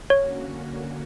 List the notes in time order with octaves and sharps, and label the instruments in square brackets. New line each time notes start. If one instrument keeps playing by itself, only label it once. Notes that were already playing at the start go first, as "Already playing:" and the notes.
[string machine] D3 A#3 C#4 F#4 [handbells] C#5